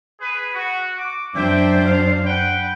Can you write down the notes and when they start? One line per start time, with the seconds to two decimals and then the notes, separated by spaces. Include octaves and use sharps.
0.19 G#4 B4
0.54 F#4
0.98 D6
1.35 F#2 D4 C5 E5 G5
1.85 F5
2.25 B4 F#5 G5